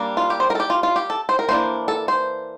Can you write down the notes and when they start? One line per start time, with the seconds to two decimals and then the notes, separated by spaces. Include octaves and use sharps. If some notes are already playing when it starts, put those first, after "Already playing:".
Already playing: G3 A#3 D4
0.17 F4
0.30 G4
0.40 C5
0.50 A#4
0.55 A4
0.60 G4
0.70 F4
0.83 F4
0.96 G4
1.10 A4
1.29 C5
1.39 A#4
1.49 E3 A#3 D4 C5
1.88 A4
2.08 C5